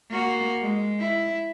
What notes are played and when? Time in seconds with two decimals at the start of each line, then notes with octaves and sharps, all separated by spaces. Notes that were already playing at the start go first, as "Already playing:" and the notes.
0.11 A#3 F#4
0.61 G#3
1.00 E4